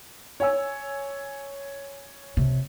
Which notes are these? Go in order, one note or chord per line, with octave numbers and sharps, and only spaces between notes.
C#5 G#5 E6
C3